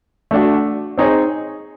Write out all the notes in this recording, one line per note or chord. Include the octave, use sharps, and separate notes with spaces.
A3 D4 F#4
C4 D#4 G#4 C#5